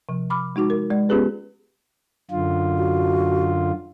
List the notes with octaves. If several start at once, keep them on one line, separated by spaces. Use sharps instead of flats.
C3 F3
B5 D6 F6
G#3 D#4 F#4 D6
A#4
G#3 D5
B3 C#4 F4 G4 G#4 B4
F#2 D3 F4
F#4